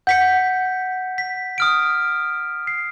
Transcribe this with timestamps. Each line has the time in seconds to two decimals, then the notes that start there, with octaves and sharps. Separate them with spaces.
0.07 F#5 G6 B6 C#7
1.18 B6
1.58 D#6 F6 D7
2.67 C7